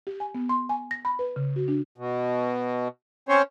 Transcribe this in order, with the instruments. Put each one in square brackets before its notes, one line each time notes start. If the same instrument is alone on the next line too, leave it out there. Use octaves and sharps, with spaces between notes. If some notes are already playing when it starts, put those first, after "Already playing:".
[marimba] G4
G#5
B3
C6
G#5
A#6
B5
B4
C#3
F#4
D4
[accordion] B2
C4 C#4 C5 C#5